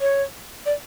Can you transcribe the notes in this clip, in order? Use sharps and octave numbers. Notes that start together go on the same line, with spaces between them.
C#5
D5